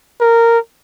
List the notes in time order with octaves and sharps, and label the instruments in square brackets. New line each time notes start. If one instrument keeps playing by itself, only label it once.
[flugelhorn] A#4